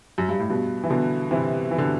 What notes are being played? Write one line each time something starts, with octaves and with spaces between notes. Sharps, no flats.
F#2
G2
A2
G2 B2
E3
B2 D3
C3 E3
E3
D3